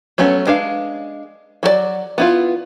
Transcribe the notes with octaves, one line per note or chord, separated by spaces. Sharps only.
F#3 A3 B3 C#4
G#3 D4 B4 F5
F#3 F#4 A4 D5
B3 E4 F4